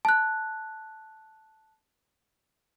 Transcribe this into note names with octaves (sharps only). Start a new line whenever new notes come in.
A5 F#6